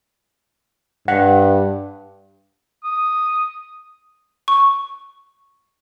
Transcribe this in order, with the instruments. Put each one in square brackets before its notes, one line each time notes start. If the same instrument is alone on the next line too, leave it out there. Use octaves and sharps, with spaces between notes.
[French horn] G2 [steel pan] F#5
[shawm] D#6
[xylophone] C#6